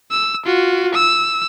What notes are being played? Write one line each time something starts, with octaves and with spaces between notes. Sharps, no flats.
E6
F4 F#4
E6